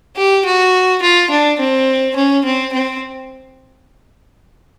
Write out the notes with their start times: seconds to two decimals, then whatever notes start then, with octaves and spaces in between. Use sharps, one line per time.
0.17 G4
0.45 F#4
1.02 F4
1.31 D4
1.59 C4
2.16 C#4
2.45 C4
2.73 C4